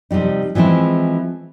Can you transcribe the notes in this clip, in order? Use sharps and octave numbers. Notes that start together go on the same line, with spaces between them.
C3 F3 G3 D#4
E3 F3 G#3 C4 E4